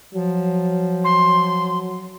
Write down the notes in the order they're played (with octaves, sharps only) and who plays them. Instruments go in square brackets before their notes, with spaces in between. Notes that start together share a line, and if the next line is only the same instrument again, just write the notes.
[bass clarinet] F3 [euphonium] F#3
[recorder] C6